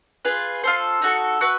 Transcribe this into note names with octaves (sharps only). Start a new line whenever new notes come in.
F4 G#4 B4
F4 A4 C5
D#4 F#4 A4
F#4 B4 E5